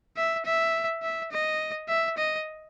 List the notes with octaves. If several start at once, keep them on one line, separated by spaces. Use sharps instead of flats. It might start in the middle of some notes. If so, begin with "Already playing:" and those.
E5
E5
E5
D#5
E5
D#5